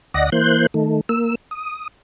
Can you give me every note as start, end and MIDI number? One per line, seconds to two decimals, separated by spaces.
0.14 0.30 38
0.14 0.30 74
0.14 0.30 75
0.14 0.30 78
0.14 0.30 94
0.32 0.66 52
0.32 0.66 58
0.32 0.66 72
0.32 0.66 90
0.32 0.66 91
0.74 1.01 51
0.74 1.01 57
1.09 1.35 58
1.09 1.35 88
1.51 1.87 87